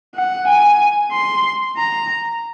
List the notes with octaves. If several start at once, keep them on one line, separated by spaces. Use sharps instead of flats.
F#5
G#5
C6
A#5